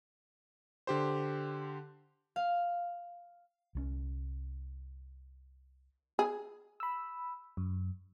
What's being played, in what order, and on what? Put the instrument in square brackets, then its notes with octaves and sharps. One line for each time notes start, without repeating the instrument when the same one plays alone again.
[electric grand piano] D3 G4 C5
[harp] F5
[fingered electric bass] C2 G#3 C#4
[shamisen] G#4
[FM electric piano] B5 E6
F#2